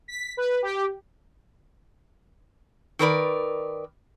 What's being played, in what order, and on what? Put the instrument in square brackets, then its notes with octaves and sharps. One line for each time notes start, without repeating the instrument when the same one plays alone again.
[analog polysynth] B6
B4
G4
[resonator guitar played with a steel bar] D#3 A#4 B4 D5